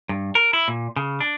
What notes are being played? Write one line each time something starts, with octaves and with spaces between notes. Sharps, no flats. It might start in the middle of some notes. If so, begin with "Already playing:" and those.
G2
A#4
E4
A#2
C#3
D4